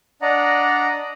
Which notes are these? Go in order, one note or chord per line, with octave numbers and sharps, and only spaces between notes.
D4 D5 D#5 F#5 A#5